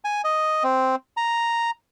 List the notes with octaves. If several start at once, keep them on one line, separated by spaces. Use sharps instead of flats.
G#5
D#5
C4
A#5